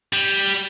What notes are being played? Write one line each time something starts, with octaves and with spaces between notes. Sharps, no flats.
G3